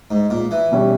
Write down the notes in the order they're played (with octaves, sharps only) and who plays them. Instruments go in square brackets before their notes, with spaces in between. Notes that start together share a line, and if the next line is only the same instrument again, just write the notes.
[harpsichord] G#2
A#2
E3
[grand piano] B2 G3 C#4